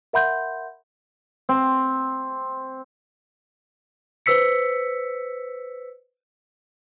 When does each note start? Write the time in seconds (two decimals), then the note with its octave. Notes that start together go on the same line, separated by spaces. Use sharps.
0.13 A#4 E5 F#5 B5 C6 G6
1.49 C4
4.26 B4 C5 E6 B6 C#7